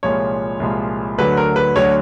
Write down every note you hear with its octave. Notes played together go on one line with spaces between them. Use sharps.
C2 A#2 F3 G#3 C#5
C2 A#2 F3 G#3
D2 D3 F#3 B4
A#4
B4
D2 D3 F#3 C#5